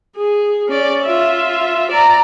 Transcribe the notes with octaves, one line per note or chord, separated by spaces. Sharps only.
G#4
C#4 D5
F4 E5
D5 A#5